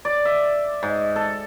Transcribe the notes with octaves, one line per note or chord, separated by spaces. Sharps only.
D5
E5
G#2
A4